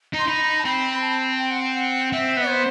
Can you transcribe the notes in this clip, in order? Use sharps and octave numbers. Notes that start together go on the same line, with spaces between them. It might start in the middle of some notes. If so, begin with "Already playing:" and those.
D#4
C6
D#4 B5
A5
C4 B5
A5
G5
F#5
G5
F#5
C4 E5
B3
C5